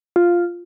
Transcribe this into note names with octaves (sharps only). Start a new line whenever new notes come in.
F4